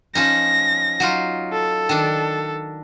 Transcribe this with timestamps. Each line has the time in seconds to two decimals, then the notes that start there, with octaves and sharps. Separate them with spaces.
0.15 F3 C#4 D#4 A#6
1.00 F#3 D#4 F4
1.52 A4
1.89 D#3 D4